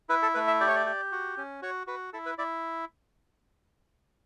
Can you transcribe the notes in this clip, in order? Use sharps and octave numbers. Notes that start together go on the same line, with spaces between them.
E4 B4
A4
A3 B4
E5
G4 D5
C#5
D5
G4
F#4
C#4
F#4 C#5
F#4 B4
E4 A4
B4
E4 D5